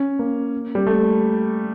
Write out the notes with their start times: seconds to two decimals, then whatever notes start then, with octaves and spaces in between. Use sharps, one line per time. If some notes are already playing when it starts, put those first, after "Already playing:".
Already playing: C#4
0.19 A#3
0.75 G3
0.87 A3